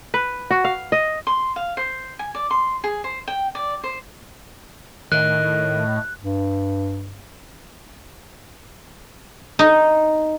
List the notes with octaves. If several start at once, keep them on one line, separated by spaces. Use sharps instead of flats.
B4
F#4
F5
D#5
C6
F5
C5
G#5
D5
C6
G#4
C5
G5
D5
C5
A2 D#3 D#5 F#6
G2
D#4